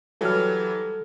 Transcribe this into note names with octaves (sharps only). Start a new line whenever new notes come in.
E3 F#3 G3 A4 F6